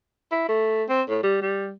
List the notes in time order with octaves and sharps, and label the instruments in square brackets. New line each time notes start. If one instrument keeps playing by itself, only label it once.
[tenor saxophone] E4
A3
C4
A2
G3
G3